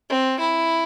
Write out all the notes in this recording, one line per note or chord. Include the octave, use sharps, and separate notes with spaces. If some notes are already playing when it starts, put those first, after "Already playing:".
C4
E4